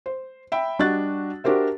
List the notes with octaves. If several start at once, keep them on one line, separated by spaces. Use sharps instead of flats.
C5
E5 G5 B5
G3 D4 F#4 D#5 F#6 A6
D4 F#4 G4 A#4 C5 E5